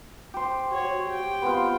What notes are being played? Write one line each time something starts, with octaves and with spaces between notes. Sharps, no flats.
G4 C5
F#4 C#5
G4 G5
B3 C4 F4